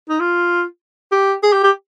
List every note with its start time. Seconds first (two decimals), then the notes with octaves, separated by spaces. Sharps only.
0.09 D#4
0.20 F4
1.12 G4
1.43 G#4
1.53 G4
1.63 G4